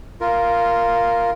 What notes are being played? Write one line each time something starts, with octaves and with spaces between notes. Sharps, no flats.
F4 A#4